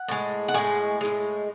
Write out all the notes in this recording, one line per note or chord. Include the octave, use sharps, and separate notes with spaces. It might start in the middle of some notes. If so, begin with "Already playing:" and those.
Already playing: F#5
A2 G#3
F#5
A2 G#3 G#5
A2 G#3